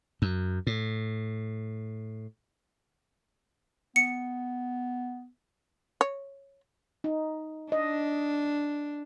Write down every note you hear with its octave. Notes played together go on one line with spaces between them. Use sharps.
F#2
A2
B3 C#7
C#5
D#4
D4 D#5